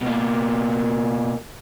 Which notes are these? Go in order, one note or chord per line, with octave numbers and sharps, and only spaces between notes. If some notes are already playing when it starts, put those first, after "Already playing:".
B2 A#3